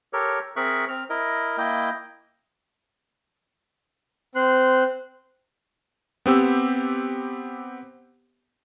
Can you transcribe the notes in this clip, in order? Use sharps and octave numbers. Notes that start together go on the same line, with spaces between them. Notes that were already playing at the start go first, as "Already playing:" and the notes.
G4 A4 A#4 C#5
C4 G#4 A#4 E5 C#6 F#6
C4 F6
E4 A#4 D#5
A#3 E4 D#5 G5
C4 C6 F#6
B3 C4 G4 E6